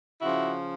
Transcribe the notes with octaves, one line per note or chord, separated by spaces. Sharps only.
C#3 F3 E4 F#4